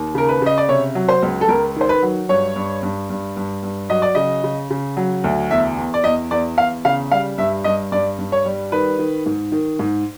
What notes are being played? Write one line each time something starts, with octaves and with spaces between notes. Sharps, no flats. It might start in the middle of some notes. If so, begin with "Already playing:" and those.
Already playing: D#2
C#3 A#4
B4
C#3 D#5
D5
C3 C#5
F#3
C5
C#2
A4
C#2 A#4
D#3 C5
B4
F#3
G2 C#5
G2
G2
G2
G2
G2
F#3 D#5
D5
C#3 D#5
C#3
C#3
F#3
D2
E2 E5
E2
D5
E2 D#5
E2 D5
E2 F5
C#3 F5
G3 F5
G2 E5
G2 D#5
G2 D5
G2
C#5
G3
D#3 B4
D#3
G#2
D#3
G#2